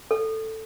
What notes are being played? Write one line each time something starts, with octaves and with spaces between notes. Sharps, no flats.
A4